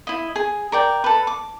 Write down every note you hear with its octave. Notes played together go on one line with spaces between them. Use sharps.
E4 D#5
G#4
A#4 D5 G5
A4 B4
D6